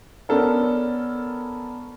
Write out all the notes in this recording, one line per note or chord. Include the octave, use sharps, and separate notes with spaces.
B3 C#4 D4 A4 A#4